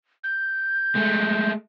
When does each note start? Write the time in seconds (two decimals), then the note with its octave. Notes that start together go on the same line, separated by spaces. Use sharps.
0.24 G6
0.95 G#3 A3